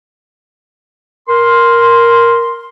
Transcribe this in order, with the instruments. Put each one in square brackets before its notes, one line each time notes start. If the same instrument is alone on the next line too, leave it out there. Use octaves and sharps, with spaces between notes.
[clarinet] A#4 [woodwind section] C6